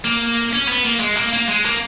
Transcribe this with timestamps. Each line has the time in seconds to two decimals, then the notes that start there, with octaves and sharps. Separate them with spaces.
0.05 A#3
0.53 C#4
0.68 B3
0.85 A#3
1.00 G#3
1.17 A#3
1.33 A#3
1.48 G#3
1.65 A#3